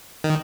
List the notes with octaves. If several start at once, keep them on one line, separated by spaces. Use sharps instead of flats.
D#3